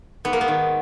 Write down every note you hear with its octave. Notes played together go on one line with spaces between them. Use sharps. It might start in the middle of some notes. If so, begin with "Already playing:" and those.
G#2 B3
A#3
B3
D#3